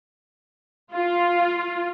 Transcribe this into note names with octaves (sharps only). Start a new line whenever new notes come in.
F4